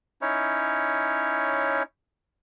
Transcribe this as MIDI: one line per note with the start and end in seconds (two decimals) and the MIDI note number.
0.22 1.83 61
0.22 1.83 63
0.22 1.83 64
0.22 1.83 73